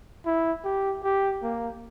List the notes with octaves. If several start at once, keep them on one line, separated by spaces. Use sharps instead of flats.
E4
G4
G4
A#3